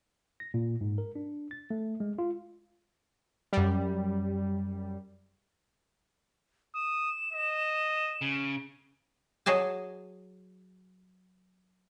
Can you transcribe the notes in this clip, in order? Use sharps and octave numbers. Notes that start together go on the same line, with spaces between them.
A#6
A#2
G#2
A#4
D4
A6
A3
G#3
F4
F#2 G3
D#6 E7
D#5
C#3
F#3 G#4 D#5 A5